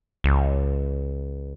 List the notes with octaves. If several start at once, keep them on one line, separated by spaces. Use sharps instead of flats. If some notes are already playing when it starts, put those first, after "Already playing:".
C#2